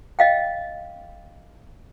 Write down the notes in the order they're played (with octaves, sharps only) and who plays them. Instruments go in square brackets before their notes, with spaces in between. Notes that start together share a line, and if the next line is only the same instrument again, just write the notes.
[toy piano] D#5 F5 G5